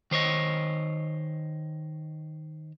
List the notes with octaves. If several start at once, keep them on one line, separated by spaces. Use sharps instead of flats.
D#3 C5 C#5 D#5